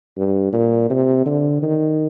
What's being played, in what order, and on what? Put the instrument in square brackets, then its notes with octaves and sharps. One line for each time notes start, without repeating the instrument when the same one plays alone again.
[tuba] G2
A#2
C3
D3
D#3